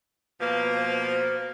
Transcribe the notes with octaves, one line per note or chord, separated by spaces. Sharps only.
B2 F3 A#3 B4
C5